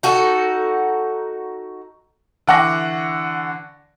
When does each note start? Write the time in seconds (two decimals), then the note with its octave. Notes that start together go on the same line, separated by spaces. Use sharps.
0.03 D#4 F#4 A4
2.47 D3 E3 F#5 C#6 D6 A#6